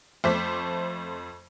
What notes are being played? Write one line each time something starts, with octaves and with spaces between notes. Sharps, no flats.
F2 A3 C5 D6 B6